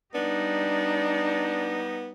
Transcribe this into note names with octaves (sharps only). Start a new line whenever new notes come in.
G3 B3 D4 D#4